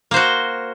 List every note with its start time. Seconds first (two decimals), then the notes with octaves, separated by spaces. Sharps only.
0.11 A#3
0.14 C5
0.16 F#4